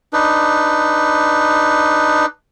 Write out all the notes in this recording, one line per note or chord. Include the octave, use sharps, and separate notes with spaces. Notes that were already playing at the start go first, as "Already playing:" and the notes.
D4 D#4 B4